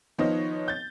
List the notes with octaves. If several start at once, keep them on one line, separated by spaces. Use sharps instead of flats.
D#3 F3 B3 D#4 C#5 D#5
G6 A6